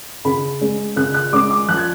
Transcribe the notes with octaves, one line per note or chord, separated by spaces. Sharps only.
C#3 B5
G#3 C#4
C#3 F#6
F#6
G#3 C#4 D6
D6
F3 F#6
G#6